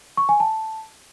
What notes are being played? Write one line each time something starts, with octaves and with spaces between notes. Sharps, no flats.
C#6
G#5
A5